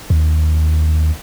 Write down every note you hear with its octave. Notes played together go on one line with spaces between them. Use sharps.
D#2